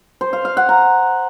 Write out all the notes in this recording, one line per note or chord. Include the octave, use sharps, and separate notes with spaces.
C5
F5
F5
F#5
A#5